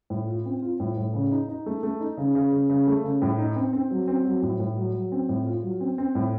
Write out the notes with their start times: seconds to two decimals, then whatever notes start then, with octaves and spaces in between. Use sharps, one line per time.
0.10 A2
0.27 F4
0.45 C4
0.62 F4
0.80 A2
0.97 A2
1.14 C#3
1.31 D#4
1.49 D#4
1.66 A3
1.83 A3
2.00 D#4
2.17 C#3
2.35 C#3
2.52 C#3
2.70 C#3
2.87 A3
3.04 C#3
3.22 A2
3.39 D#4
3.56 C4
3.73 C4
3.91 F#3
4.08 C4
4.25 F#3
4.42 A2
4.60 A2
4.77 F#3
4.94 F#3
5.12 C4
5.29 A2
5.46 F4
5.63 F#3
5.80 C4
5.98 C4
6.15 A2